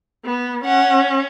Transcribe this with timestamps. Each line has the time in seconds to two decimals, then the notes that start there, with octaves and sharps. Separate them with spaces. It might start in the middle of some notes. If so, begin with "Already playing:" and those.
0.25 B3
0.65 C#4 F#5